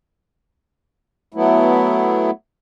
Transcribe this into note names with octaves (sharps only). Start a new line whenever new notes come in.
F#3 A3 B3 E4